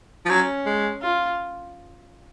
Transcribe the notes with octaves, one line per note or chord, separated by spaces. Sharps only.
F3
F#3 C#4
G#3
F4